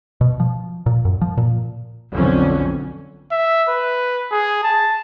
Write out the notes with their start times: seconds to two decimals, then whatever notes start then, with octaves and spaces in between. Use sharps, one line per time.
0.21 B2
0.40 F3
0.86 A#2
1.05 F#2
1.21 F3
1.37 A#2
2.12 B1 F2 D3 C#4
3.32 E5
3.69 B4
4.32 G#4
4.63 A5